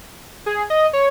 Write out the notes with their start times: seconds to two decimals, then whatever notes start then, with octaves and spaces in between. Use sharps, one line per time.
0.46 G#4
0.70 D#5
0.93 C#5